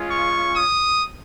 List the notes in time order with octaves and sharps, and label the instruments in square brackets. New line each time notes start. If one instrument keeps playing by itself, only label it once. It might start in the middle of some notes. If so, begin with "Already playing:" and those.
Already playing: [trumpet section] G#3 C#4 F4
C#6
D#6